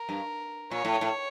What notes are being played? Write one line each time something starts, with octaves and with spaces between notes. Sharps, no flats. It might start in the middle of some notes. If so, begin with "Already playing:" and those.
Already playing: A#4
G2
A#2 C#5
A2
A2